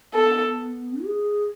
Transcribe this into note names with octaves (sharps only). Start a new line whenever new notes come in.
B3 A4
G#4